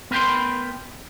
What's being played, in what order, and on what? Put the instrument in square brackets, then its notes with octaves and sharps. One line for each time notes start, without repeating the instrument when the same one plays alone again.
[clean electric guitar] B3 A#4 B4 G5 C6